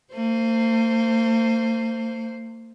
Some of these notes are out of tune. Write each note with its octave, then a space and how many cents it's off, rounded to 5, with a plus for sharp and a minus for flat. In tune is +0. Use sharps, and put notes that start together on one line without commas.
A#3 -45 C5 +0